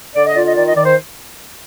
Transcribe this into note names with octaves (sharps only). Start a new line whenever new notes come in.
D3 D5
D#5
F4 D5
D#5
D#3 D5
D#5
D#3 D5
C5